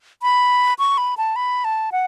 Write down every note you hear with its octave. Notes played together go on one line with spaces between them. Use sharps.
B5
C#6
B5
A5
B5
A5
F#5